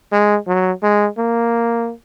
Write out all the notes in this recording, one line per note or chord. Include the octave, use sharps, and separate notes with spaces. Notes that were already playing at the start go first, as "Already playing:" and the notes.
G#3
F#3
G#3
A#3